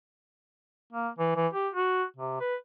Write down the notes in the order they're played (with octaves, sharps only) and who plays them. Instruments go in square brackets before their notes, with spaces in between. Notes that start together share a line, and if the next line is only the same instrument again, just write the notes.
[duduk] A#3
E3
E3
G4
F#4
C3
B4